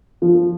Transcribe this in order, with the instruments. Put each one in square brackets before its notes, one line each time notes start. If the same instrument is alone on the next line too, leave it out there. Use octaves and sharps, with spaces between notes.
[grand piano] F3